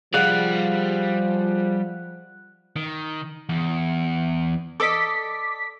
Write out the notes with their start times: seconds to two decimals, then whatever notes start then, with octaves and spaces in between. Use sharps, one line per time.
0.14 F3 G3 G#4 D5 F5 F#5
2.76 D#3
3.49 E2
4.80 A4 D5 D#5 D6 B6